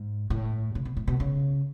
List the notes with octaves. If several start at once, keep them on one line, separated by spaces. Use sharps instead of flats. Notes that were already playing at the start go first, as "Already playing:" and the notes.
Already playing: G#2
A2
C#3
B2
A2
B2
C#3